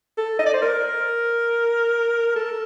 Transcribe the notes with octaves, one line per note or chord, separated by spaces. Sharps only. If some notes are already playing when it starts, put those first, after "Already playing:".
A4
D#5
D5
C5
A#4
A4